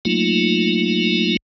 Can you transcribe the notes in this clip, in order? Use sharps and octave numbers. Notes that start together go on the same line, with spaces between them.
F#3 A3 A#3 D#4 F4